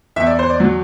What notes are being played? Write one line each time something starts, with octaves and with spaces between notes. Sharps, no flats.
E2 E5
D5
C5
D5
F#3